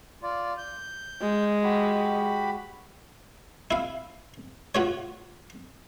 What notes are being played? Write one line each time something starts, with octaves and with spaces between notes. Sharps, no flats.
F4 D5
G6
G#3
F#4 G4 B5
E4 F5
F4 F#4 C#5